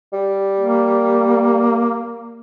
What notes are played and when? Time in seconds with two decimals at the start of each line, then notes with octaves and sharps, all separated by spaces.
0.13 G3
0.60 A#3